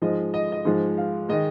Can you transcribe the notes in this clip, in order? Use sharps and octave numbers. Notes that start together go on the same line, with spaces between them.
G#2 F3 G#3 D#5
D#5
D#5
G#2 F3 G#3
F5
D#3 G#3 D#5